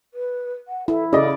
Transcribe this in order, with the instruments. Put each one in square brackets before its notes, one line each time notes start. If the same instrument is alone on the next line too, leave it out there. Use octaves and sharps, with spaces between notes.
[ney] B4
F#5
[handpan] E4 [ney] A4
[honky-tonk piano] C#3 D#5 [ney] A4 [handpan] D5